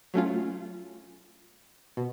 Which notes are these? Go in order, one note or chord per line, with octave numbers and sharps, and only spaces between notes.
F#3 A3 C#4 F4
B2